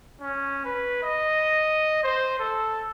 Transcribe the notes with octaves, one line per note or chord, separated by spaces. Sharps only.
C#4
B4
D#5
C5
A4